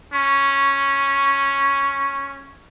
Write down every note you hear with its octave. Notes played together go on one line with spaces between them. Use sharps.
C#4 C#6